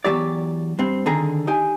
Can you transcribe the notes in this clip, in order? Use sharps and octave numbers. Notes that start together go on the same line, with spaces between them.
E2 C3 F#3 G4 D5
G2 C4
D3 D#3 G#4 A#5
D#4 G4 G#5